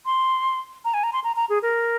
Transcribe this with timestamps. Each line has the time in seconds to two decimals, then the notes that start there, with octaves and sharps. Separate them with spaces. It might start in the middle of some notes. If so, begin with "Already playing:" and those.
0.06 C6
0.85 A#5
0.94 G#5
1.04 A#5
1.13 C6
1.24 A#5
1.36 A#5
1.49 G#4
1.62 A#4